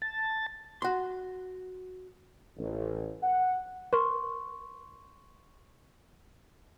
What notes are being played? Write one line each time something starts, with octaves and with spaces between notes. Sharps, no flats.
A5
F#4 C6
A1
F#5
A#4 C6 C#6